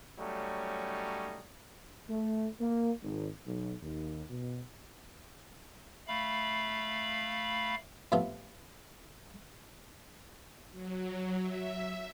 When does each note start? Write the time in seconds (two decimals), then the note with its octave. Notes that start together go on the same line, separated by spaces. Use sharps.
0.18 F#3 G3 A3 C#4 D#4
2.09 A3
2.60 A#3
3.02 G#1
3.46 B1
3.82 D#2
4.30 B2
6.08 A3 F5 B5
8.12 A2 C3 F3 B3 F4
10.71 F#3
11.42 E5